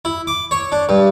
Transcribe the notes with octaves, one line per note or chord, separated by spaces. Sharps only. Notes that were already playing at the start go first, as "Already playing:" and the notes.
E4
D6
C#5
D4
G2